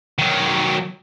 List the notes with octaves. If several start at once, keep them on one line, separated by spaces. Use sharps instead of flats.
D#3 F#3